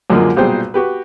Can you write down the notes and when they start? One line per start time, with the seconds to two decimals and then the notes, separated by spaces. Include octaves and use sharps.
0.10 C#2 F#2 D3 F3 G#3 A#3
0.36 B1 A#2 G3 G#4 C5 G5
0.74 F#4 G4 B4